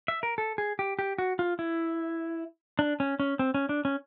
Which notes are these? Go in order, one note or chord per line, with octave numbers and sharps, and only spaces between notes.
E5
A#4
A4
G#4
G4
G4
F#4
F4
E4
D4
C#4
C#4
C4
C#4
D4
C#4